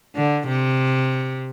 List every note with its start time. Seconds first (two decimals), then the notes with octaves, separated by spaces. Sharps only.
0.16 D3
0.47 C3